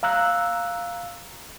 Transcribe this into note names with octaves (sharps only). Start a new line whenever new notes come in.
F5 A#5 E6 F#6